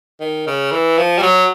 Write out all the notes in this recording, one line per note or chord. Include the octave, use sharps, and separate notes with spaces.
D#3
C#3
E3
F3
G3
F#3